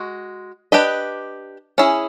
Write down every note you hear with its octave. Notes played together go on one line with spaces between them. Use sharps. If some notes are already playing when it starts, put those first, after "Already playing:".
Already playing: G#3 F#4
D4 G4 B4 D#5
C#4 E4 G#4